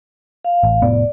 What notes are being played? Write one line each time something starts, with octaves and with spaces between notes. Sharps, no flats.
F5
A1
F1 A2 B3 D5